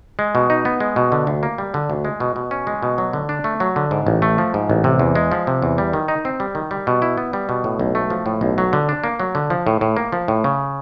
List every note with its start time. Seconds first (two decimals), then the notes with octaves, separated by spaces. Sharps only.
0.19 G#3
0.35 B2
0.50 D#4
0.65 B3
0.80 G#3
0.96 B2
1.12 D3
1.27 D2
1.43 A#3
1.58 G3
1.74 D3
1.90 D2
2.05 G#3
2.20 B2
2.36 B2
2.51 C#4
2.67 G#3
2.83 B2
2.98 F#3
3.13 D3
3.29 D4
3.44 A3
3.60 F#3
3.76 D3
3.91 G#2
4.07 A1
4.22 A3
4.38 F3
4.54 G#2
4.70 A1
4.84 C3
5.00 E2
5.15 G#3
5.32 F3
5.47 C3
5.62 E2
5.78 G3
5.93 D#3
6.08 D#4
6.25 C4
6.40 G3
6.55 D#3
6.71 G3
6.87 B2
7.02 E4
7.18 B3
7.33 G3
7.49 B2
7.64 A2
7.79 B1
7.95 A3
8.10 F3
8.26 A2
8.41 B1
8.58 F#3
8.73 D3
8.89 D4
9.04 A#3
9.20 F#3
9.35 D3
9.50 F3
9.67 A2
9.81 A2
9.97 A#3
10.12 F3
10.28 A2
10.44 C#3